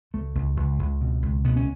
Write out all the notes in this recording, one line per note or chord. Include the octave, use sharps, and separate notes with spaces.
C#2 A3
C#2
C#2
C#2
B2
C#2
B2 B3
C#4